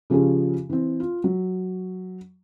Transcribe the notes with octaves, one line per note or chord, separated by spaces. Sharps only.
C#3 F3 C#4 G4 G#4
E3 C4
F4
F#3